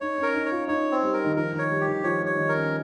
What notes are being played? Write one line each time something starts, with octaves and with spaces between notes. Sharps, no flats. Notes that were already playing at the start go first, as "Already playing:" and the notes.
D#4 C#5
C#4
A#4
D#4
C#5
F4
D#4 C#5
C4
G3
A#4
D#3
F3 A#4
D#3
C#5
G3
G4
D#3
F3 C#5
G3
C#5
D#3
A#4
C#4